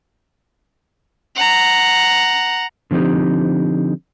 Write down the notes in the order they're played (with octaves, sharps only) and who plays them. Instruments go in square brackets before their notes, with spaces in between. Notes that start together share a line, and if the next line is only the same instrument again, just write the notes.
[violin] F#5 A#5
[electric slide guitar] D3 F3 C4 D#4 G4